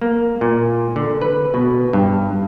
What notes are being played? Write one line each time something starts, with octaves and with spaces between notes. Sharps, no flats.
A#3
A#2
D3
B4
B2
G2